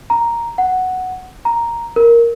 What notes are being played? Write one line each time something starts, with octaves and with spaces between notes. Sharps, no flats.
A#5
F#5
A#5
A#4